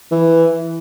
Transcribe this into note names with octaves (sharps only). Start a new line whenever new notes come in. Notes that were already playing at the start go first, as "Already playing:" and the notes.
E3